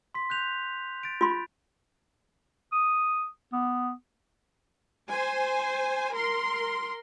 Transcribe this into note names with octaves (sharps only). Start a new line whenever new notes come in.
C6 B6
F#6 G6 F7
A6 D7
F4 C6
D#6
B3
C5 G#5
A#4 C6